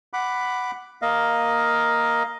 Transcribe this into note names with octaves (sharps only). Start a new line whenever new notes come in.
F#5 B5 D6
A#3 D#5 F5